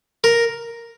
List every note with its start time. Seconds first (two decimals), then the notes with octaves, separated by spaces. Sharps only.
0.24 A#4